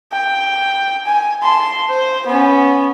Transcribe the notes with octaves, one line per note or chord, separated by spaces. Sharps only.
G5
G#5
A5 C6
C5
B3 C#4